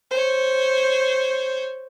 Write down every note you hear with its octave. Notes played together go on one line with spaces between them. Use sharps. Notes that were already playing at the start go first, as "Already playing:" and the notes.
C5 C#5